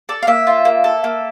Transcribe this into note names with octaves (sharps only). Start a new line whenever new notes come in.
A4 D5
F5
A#3 E5
F4
A#3
A4
A#3